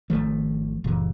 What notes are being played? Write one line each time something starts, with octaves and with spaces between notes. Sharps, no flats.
G#1 D#3 F3 A3
F#1 A#2 E3